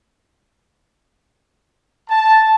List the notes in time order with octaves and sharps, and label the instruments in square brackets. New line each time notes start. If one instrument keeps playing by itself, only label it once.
[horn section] A5